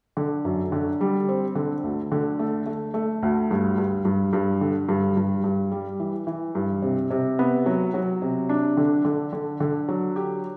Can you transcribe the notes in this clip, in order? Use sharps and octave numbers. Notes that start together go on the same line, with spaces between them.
D3
F#2
D3
G3
C4
D3
D2
D3
A3
A3
A3
D2
G2
G2
G2
G2
D3
G2
G2
G2
G3
E3
E3
G2
C3
C3
B3
F#3
F#3
C3
D4
D3
D3
D3
D3
F#3
G4